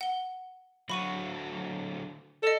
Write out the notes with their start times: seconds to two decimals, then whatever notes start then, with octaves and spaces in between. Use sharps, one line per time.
0.01 F#5 G7
0.90 D3 F#3 F#4 B5 C#6 D#7
2.43 A4 D5 D#5